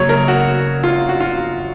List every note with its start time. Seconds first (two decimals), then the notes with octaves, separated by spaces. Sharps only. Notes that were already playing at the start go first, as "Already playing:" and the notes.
Already playing: F#2 C#3 F#3 A#3 C#5
0.09 A#4
0.28 F#4
0.84 F4
1.09 F#4
1.20 F4